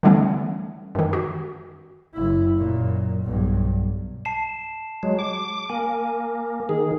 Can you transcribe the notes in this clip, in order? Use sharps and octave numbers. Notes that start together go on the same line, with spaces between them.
D3 E3 G3 A3 B3 C#4
F#2 D#3
F#4
F#1 E4
F#2 A#2
B1 G2
A5 C7 E7
F#3 G#3
D6
A#3 G#5
D#3 G#4